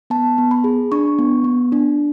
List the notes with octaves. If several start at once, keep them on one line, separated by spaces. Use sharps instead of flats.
B3 A5
B3
B5
G#4
D4 C#6
B3
B3
D4